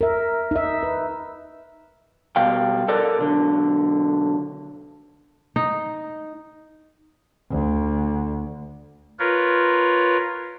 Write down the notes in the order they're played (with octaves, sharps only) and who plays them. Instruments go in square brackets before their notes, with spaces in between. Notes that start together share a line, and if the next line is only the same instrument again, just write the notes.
[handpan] A#4 E5
D#4 E5
B4
[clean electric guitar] B2 G3 F5 G5
A4 A#4 D5
B1 D3
[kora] D#4
[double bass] D2
[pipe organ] F4 A#4 B4 C#5